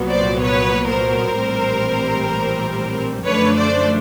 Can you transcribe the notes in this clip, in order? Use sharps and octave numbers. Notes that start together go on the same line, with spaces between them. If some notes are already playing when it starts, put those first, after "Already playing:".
Already playing: C2 A#2 F#3 B3
C5 D5
B4 C#5
A#4 C5
A#1 A2 E3 G3 C4
F#2 D3 F3 A3 D4 B4 C#5
C5 D5